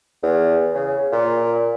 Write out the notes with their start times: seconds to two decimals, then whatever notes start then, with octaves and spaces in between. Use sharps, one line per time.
0.23 E2
0.74 C#3
1.12 A#2